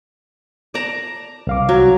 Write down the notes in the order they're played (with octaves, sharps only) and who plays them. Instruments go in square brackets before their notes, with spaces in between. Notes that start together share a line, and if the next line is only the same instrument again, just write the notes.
[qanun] D5 A5 A#5
[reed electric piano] C2 F5 D6
[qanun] F#3